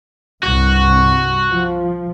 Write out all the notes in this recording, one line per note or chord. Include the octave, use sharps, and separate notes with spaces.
C2 G2 F#4
F3